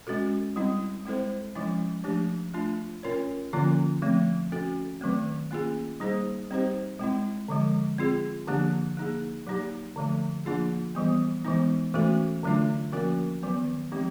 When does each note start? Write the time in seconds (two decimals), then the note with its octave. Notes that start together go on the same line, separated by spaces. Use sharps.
0.07 G#3 C#4 F#4 A4
0.56 G3 C4 E4
1.06 G#3 C4 E4 A4 C5
1.55 F3 G#3 C#4 E4
2.04 F3 A3 D4 G4
2.54 A3 D4 F4
3.03 C#4 F4 A#4 C#5
3.53 D3 F3 A#3 C#4 F4
4.02 F3 A3 C4
4.52 C#4 F#4 A4
5.01 D#3 F#3 A3 C4
5.51 A#3 C#4 F4 G#4
6.00 G3 A#3 D#4 G#4 C5
6.50 G3 C4 D#4 G4 C5
6.99 G#3 C4 E4
7.48 D3 F3 G#3
7.98 C4 F4 G#4
8.47 D3 F3 A#3 D4 G4
8.97 A#3 D#4 G#4
9.47 F#3 A#3 D#4 G4
9.96 D3 F3 A3
10.45 F3 A#3 D4 F4 G#4
10.95 E3 G3 B3
11.45 E3 G#3 B3 D#4
11.94 E3 A3 C#4 F#4 A4
12.43 D3 F#3 A3 D4 F4
12.93 F3 A#3 C#4 F#4 A#4
13.43 D#3 F#3 B3
13.92 F3 G#3 C4 D#4 G4